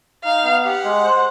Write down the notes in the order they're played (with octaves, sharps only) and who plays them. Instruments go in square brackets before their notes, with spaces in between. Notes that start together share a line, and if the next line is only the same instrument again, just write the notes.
[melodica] D#4 [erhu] F5
[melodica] B3
[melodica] G4 [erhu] F#5
[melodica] G#3
C5